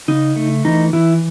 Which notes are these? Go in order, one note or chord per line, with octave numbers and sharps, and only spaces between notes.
C#3 D#4
A3
E3 D#4
E3 E4